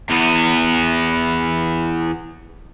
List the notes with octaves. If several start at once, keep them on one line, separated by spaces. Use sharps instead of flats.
E2 B3